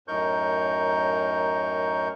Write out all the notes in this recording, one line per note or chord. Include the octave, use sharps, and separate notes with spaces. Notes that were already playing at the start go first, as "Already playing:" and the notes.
F#2 A2 D#4 A#4 C#6 G6